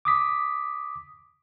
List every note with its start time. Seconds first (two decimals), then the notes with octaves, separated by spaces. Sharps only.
0.05 D6 D#6 B6